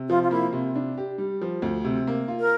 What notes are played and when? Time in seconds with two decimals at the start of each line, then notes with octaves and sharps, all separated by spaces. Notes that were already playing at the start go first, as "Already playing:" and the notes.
Already playing: C3
0.09 F3 F4
0.23 F4
0.31 A#3 E4
0.53 C3
0.76 D4
0.98 G4
1.18 G3
1.41 F3
1.62 D2
1.85 C3
2.07 A#3
2.28 F4
2.40 A#4